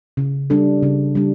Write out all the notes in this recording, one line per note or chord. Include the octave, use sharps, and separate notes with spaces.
C#3
G3 D4 A4
C#3
G3 D4